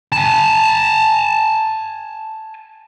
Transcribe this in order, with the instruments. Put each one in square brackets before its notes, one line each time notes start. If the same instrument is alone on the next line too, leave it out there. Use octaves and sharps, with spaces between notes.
[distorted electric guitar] G#5 A5